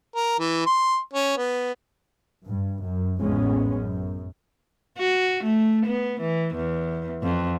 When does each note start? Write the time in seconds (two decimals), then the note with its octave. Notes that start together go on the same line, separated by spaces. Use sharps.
0.16 A#4
0.39 E3
0.66 C6
1.13 C#4
1.38 B3
2.45 G2
2.81 F#2
3.21 A1 F2 G#3 B3 C#4
3.74 F#2
4.98 F#4
5.44 A3
5.86 B3
6.21 E3
6.56 E2
7.23 F2